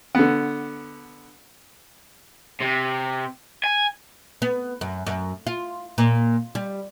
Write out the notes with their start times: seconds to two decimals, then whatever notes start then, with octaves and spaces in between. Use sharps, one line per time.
0.15 D3 B3
2.60 C3
3.64 G#5
4.42 B3
4.81 F#2
5.07 F#2
5.47 F4
5.98 A#2
6.55 G3